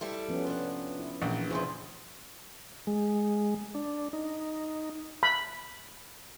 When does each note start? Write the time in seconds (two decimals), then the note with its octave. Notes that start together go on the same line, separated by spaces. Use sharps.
0.01 G3 E4 A4
0.28 F3 B3 C#4
0.47 C3 D4
1.00 E4
1.22 A#1 E3
1.50 E2 C#3 F3 E4 G#4 C5
2.87 G#3
3.75 D4
4.13 D#4
5.23 B5